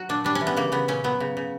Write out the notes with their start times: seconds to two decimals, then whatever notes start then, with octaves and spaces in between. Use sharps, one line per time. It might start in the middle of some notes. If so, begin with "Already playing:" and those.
Already playing: F#3 F#4
0.09 A#2 D4
0.24 G3 D4
0.35 C#4
0.41 E3
0.47 B3
0.57 C#3 A#3
0.72 C#3 B3
0.88 A#2 C#4
1.04 F#3 B3
1.20 C#3
1.37 C#3